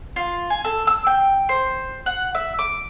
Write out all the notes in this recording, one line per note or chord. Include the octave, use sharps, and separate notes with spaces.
F4
G#5
A4
E6
G5
C5
F#5
E5
D6